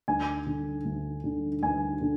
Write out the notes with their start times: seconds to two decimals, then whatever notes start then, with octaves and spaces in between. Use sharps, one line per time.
0.08 D2 G#5
0.46 D3
0.85 D2
1.24 D3
1.62 D2 G#5
2.01 D3